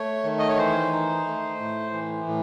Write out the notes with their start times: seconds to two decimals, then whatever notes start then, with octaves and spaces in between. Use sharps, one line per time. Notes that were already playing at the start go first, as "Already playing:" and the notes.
Already playing: A3 C#5
0.24 D#3
0.39 D#5
0.49 C#5
0.58 E3 C5
0.93 D#4
1.26 A3
1.59 A2
1.93 E3
2.28 A2